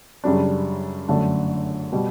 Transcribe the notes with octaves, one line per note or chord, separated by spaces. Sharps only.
F#2 C#3 G3 D4
G1 F#2 D3 A3 D4
B2 G3